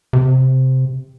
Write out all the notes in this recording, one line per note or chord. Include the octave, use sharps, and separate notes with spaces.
C3